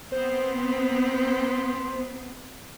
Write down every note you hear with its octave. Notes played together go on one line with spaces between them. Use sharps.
B3 C4 C5